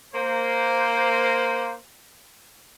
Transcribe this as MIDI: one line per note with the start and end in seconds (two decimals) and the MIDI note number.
0.14 1.74 58
0.14 1.74 72